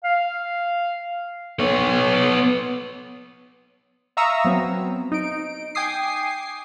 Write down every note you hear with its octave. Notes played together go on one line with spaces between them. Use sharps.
F5
B3 C#5
E5 F5 A#5 C#6 D#6 E6
F#3 B3 C4
D#4 D7
G5 G#5 D6 D#6 C7